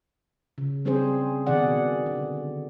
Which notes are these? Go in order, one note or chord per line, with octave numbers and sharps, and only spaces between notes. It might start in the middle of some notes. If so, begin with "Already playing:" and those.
C#3
G3 C4 C#4 G#4 C5
B2 D#3 G#4 D5 F#5
D3